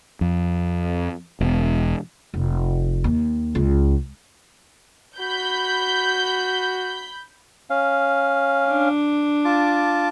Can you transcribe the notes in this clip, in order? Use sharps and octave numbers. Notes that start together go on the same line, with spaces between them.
F2
E1
F1
D#2
C#2
F#4 B5 G6
C#4 F5
D4
F4 A5 D6